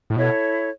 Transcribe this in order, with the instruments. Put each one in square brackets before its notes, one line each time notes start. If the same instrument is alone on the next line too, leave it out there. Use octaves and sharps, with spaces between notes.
[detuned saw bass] A2
[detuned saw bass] B2 [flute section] E4 A4 C#5